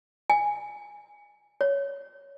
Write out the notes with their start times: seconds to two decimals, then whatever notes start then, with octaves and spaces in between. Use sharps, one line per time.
0.30 G#5
1.61 C#5